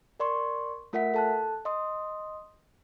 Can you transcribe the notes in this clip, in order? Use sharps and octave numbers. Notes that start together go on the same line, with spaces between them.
A#4 D5 C6 C#6
A3 F4 A#4 E5 F#5 B6
A4 A5 F#6
D#5 C6 D#6